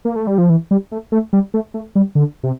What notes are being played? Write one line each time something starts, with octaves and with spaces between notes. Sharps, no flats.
A#3
A3
G3
F3
E3
G3
A3
A3
G3
A3
A3
G3
D3
C3